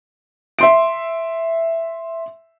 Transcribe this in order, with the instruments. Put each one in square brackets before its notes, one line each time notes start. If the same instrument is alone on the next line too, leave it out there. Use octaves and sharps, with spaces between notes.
[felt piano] E5 C6 D7